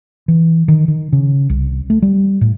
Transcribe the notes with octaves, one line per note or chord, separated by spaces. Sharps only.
E3
D#3
D#3
C#3
C2
A3
G3
A2